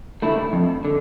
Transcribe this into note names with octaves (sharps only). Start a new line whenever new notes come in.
D3 A3 E4
F2
D3